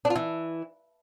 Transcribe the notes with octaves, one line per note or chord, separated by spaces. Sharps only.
D4
F4
E3